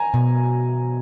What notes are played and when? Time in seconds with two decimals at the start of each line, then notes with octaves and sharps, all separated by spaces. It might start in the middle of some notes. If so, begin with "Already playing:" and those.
Already playing: G#5 A#5
0.14 B2